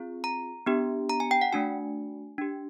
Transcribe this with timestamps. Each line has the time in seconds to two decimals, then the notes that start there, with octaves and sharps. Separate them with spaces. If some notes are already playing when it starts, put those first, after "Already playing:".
Already playing: C4 F4 G#4
0.24 A#5
0.66 B3 D4 G4
1.09 A#5
1.20 G#5
1.31 G5
1.41 F#5
1.52 A3 D4 F#4 G#5
2.38 D4 G4